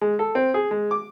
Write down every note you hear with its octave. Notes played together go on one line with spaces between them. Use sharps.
G#3
A4
C4
G#4
G#3
D6